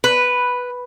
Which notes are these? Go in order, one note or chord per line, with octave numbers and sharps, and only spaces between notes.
B4